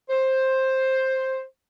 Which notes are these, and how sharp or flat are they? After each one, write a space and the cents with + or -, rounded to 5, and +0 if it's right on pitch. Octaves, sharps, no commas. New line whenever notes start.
C5 +10